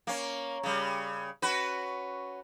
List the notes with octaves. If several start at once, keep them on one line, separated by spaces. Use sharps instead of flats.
A#3 C#4
C#3 G3
C#4 F#4 B4